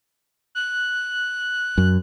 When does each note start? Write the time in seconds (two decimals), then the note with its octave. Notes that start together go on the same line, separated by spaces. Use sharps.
0.55 F#6
1.78 F#2